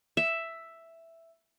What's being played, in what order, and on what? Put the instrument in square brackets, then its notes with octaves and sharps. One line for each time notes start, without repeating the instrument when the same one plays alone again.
[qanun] E5